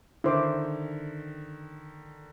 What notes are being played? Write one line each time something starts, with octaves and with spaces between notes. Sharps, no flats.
D3 D#3 E4 C5 D6